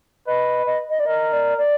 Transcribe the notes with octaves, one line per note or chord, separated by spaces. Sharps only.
B4 D#5
D#5
D#5
D5
A#4 D#5
D5
D5